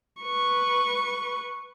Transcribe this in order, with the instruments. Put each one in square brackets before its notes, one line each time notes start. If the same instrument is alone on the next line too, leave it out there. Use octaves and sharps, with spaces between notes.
[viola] B4 C#6